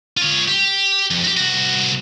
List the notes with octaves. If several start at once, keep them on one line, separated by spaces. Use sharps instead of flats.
F4 C#5
G4
F2
F#4 G4
C2 F#4